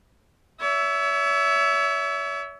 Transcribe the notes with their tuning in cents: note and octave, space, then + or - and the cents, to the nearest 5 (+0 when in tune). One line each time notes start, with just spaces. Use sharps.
C#5 +35 E5 +0